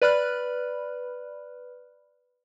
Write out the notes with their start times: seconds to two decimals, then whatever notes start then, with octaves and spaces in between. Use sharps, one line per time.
0.02 B4 D5 B5 F6 F#6